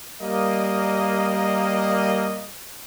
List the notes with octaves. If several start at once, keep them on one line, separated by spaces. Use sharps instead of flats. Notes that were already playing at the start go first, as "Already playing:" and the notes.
G3 A#3 D#5